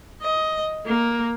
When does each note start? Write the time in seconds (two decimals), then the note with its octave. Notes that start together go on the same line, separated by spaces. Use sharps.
0.22 D#5
0.86 A#3